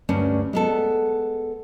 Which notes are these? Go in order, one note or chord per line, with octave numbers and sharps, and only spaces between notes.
D2 G2 C#4 D4
G#3 B3 A4